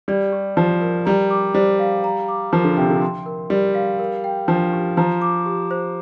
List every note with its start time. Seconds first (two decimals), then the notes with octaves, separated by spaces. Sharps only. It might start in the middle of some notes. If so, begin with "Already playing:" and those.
0.08 G3 D5
0.32 G4
0.57 F3 G4
0.81 A#4
1.06 G3 A#5
1.31 D6
1.54 G3 C5
1.79 F5
2.04 A#5
2.28 D6
2.53 F3 A#4
2.64 D3
2.77 C3 G5
2.89 D3
3.02 C6
3.26 A#4
3.50 G3 A#4
3.75 F5
3.99 A#4
4.24 G5
4.48 F3 D4
4.73 G4
4.97 F3 A#5
5.22 D6
5.46 G4
5.71 C5